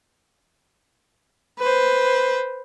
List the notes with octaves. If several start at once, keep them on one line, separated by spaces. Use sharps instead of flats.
B4 C5